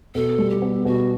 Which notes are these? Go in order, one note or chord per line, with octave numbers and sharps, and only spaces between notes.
B2 A4
G3
G4
B3
B2 F#4